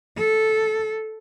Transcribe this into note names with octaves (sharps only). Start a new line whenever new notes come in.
A4